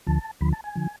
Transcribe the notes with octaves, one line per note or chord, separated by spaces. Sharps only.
D2 D3 F3 A5
D2 D3 F3 B5
A5
G#5
D3 F3